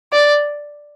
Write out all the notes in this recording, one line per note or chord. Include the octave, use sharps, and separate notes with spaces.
D5